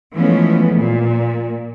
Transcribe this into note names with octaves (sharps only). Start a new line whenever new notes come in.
E3 F3 G#3 A3 B3 C#4
A#2